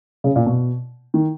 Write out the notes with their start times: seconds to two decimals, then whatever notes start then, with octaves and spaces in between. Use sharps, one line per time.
0.24 C#3
0.36 A#2
0.46 B2
1.14 D#3